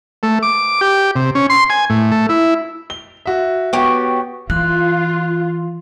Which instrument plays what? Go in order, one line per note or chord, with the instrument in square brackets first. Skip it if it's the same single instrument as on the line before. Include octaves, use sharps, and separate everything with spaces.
[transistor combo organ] A3
D6
G4
C3
C#4
C6
G#5
A2
A3
E4
[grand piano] G7
F#4 E5
[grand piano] B3 F#4 [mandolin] G4 C#5
[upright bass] E3 [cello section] F4 [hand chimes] F#6